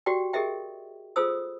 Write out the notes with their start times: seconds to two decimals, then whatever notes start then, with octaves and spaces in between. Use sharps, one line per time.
0.06 F#4 G4 D5 G5
0.33 G4 G#4 A#4 D#5 E5 G5
1.16 F4 G#4 A4 C5 D#6 E6